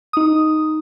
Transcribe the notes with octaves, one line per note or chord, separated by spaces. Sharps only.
D#4 D#6